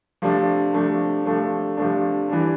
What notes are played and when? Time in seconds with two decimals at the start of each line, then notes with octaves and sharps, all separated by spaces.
0.22 C3 F3 A3 D4
0.74 C3 F3 A3 D4
1.25 C3 F3 A3 D4
1.77 C3 F3 A3 D4
2.29 E3 G3 D4